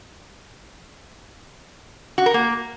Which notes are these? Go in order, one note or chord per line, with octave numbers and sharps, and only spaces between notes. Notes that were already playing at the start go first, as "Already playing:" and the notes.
F#4
A#4
A#3